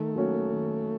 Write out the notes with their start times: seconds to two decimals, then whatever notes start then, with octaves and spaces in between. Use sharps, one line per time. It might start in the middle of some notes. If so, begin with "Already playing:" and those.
Already playing: D#3 A3
0.15 F#3 A#3 C#4 F#4
0.50 D#3